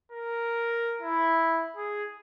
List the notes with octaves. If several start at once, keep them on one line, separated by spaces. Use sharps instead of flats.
A#4
E4
G#4